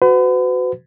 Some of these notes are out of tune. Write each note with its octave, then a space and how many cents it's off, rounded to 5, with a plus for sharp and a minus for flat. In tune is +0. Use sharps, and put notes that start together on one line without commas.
F#4 +0 B4 +40